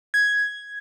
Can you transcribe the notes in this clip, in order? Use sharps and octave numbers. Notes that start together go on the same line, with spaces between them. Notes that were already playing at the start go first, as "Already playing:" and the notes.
G#6